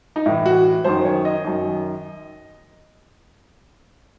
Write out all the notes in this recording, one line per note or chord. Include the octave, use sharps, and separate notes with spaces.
D#4
A2 E3 E4
F#4
F#2 D#3 C5
C#5
D#5
F#2 D#3